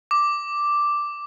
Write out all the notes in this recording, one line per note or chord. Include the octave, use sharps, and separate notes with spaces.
D6